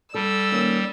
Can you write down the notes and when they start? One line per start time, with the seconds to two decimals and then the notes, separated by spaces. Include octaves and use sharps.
0.14 G3 A4 E6
0.52 D#3 A#3 C#4